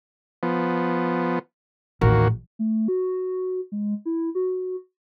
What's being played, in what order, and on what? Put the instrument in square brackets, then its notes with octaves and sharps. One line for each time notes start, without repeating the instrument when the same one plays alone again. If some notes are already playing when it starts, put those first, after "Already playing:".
[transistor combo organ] F3 B3
[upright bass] A1 [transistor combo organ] D#2 A#3 F#4
[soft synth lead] A3
F#4
G#3
E4
F#4